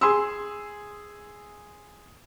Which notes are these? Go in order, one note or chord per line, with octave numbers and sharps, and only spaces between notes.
G#4 C6 E6